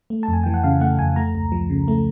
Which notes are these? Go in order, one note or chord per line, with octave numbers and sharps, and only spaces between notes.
A3
F2 A5
G#5
E3 G5
F#5
C#3 F5
A3 F#5
F2 G#5
A3 A#5
C#2
F3
C#3
A3